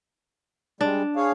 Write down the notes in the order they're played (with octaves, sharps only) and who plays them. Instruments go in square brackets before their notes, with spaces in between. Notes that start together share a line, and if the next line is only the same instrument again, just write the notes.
[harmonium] G3 G#3 [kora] D4
[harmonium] G#4 C#5 F5